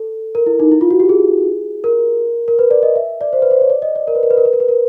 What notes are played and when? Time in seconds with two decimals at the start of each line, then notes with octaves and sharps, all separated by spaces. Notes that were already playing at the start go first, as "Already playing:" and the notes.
Already playing: A4
0.35 A#4
0.46 E4
0.60 D#4
0.72 E4
0.81 F4
0.91 F#4
1.00 G4
1.09 G#4
1.84 A#4
2.48 A#4
2.59 B4
2.71 D5
2.83 D#5
2.96 E5
3.21 D5
3.33 C5
3.42 B4
3.51 C5
3.61 C#5
3.70 D5
3.82 D#5
3.96 D5
4.08 A#4
4.15 B4
4.23 A#4
4.30 B4
4.37 A#4
4.45 B4
4.53 A#4
4.60 B4
4.68 A#4